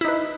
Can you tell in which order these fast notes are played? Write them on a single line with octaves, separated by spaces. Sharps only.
E4 D#4 B4